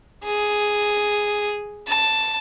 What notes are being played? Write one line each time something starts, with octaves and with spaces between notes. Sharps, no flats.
G#4
A5